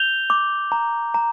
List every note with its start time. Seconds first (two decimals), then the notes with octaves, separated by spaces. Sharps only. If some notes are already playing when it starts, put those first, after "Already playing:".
Already playing: G6 F7 G7
0.30 D6
0.72 A#5
1.14 A#5